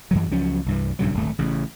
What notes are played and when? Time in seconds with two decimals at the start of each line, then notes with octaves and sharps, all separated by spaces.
0.11 F#2 E3 F#3
0.31 C#2 F3 F#3 C#4
0.66 C2 G2 E3
0.99 A#1 G2 C#3 F#3
1.14 D1 G#1 A3
1.39 A1 C#3